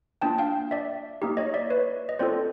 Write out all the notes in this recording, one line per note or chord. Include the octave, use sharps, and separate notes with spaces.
A#3 D4 F4 G5 A5
F5 G5
D5 E5
A#3 D#4 G4
C#5 D#5
D5 E5
B4 C#5
D#5
C4 F4 A4 C5 D5